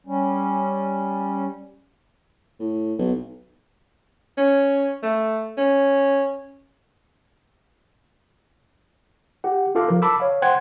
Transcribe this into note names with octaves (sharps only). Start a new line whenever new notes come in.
G3 C#4
A2
B1
C#4
A3
C#4
G4 F#5
D#4 F4 A4 F5 D6
F3 A#4
A5 B5 D6 E6
C#5 F5
C5 F#5 G5 C6 F#6 G#6